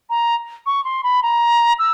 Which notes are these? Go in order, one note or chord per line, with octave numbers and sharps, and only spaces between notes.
A#5
C#6
C6
B5
A#5
E6